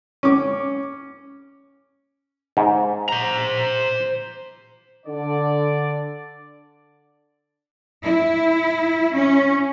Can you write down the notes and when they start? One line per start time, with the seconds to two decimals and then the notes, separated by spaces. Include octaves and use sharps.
0.23 C#4 D6
2.57 G#2
3.09 C5 A#5
5.07 D3 D5
8.03 E4
9.15 C#4